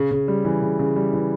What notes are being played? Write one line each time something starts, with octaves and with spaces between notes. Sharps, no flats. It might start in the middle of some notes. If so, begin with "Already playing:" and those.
Already playing: C#3
C#3
G3
E3
C#3
C#3
G3
E3